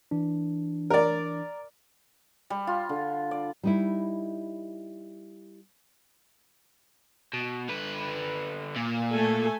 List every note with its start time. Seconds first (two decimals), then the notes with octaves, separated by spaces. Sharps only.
0.11 E3 D4
0.90 A#4 D5
2.50 G3
2.67 F4
2.89 D3
3.31 D5
3.63 G3 D#4 E4
7.34 B2
7.69 D3 B4
8.77 A#2
9.11 A3 A4 G#5